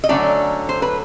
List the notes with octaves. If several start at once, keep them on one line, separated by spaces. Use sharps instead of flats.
D#5
D3 F#3 A3 C#4 D5
C5
B4